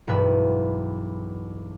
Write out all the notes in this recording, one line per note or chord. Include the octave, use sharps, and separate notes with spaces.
E1 B1 G2 B4 E5